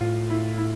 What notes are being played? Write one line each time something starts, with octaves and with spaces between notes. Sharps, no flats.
A2 F4
E4
E4